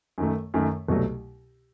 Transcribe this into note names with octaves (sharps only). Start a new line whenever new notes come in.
F#2 D#3 A3
F#2 D#3 A3
C2 B2 F#3 A3